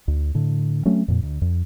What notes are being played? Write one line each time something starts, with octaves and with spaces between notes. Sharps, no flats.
D2
A2 D3
F#3 A3 C4 C#4
F2 A#2
D2
F2